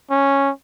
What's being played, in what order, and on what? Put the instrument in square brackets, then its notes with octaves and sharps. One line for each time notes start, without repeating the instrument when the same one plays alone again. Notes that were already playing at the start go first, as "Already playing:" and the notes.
[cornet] C#4